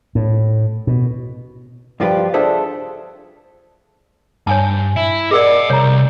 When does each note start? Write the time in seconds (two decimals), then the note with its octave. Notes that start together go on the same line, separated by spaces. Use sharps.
0.15 A2
0.87 B2
2.00 G2 F3 F4 G4 B4 F5
2.34 D4 F4 G#4 A4 C5 E5
4.47 G2 C#5 G#5 A5
4.96 E4
5.31 G#4 A#4 D5 D#5 F#5
5.70 C2 C#5 A#5